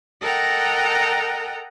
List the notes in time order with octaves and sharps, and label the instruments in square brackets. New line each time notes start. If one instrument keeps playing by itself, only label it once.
[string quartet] A4 A#4 D#5 F#5 G5 A#5